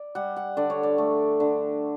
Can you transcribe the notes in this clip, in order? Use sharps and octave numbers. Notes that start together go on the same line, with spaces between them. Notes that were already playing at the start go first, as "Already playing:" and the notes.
Already playing: D5
G3 F#5
F#5
D3 D5
C#5
D5
A3
D3